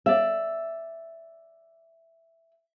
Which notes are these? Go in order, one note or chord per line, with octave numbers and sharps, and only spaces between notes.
D5 E5